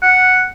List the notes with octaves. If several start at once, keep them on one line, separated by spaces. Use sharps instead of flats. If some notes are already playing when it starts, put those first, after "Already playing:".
F#5